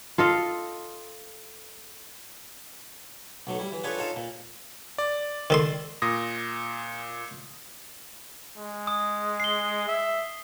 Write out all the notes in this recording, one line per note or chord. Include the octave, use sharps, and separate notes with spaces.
F4 A4 D#5 F5
B1 F#3 A3
G3 E4
E3
D4 F4 G#4 A4 B4 C#5
D#4 F4 A4 C#5 F5 A5
A#2
D5
D#3 A4 C6
A#2 D#6 A#6
G#3
D#6
C7 G7
E5